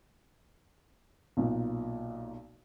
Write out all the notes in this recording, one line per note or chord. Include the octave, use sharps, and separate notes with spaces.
B1 A#2